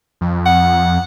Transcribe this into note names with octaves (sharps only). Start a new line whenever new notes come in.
F2
F#5